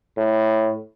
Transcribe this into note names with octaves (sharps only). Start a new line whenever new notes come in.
A2